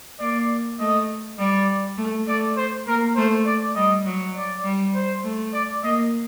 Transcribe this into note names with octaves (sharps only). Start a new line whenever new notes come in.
A#3 D5
A3 D#5
G3 D5
A3
A3 D5
C5
A#3 A#4
A3 C5
D5
G3 D#5
F#3
D5
G3
C5
A3
D5
A#3 D#5